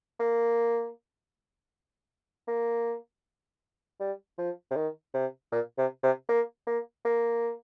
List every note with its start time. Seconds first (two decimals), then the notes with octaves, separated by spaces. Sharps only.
0.20 A#3
2.48 A#3
4.00 G3
4.38 F3
4.71 C3
4.76 D#3
5.14 C3
5.52 A#2
5.78 C3
6.03 C3
6.29 A#3
6.67 A#3
7.05 A#3